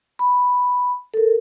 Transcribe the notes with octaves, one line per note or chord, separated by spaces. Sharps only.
B5
A4 A#4